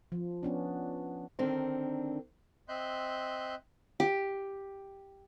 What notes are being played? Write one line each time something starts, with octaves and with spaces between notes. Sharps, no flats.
F3
B3 C#4 D4
D3 D#3 C4 D4 A#4
C4 D#5 E5 C6 F#6 G6
G4